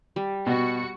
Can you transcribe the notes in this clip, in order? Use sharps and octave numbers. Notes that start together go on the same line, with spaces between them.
G3
B2 F#4 C#7